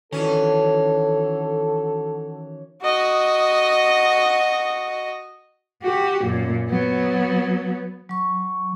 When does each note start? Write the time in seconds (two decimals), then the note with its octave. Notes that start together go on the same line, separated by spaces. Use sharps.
0.12 D#3 E3 C#4 D4 F#4 A4
2.83 F#4 D#5
5.83 F#4 G4
6.24 F#2 A#2
6.69 F#3 B3
8.09 F#3 C#6